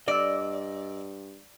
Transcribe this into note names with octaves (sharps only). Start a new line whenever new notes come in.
G2 D5 D#5 E6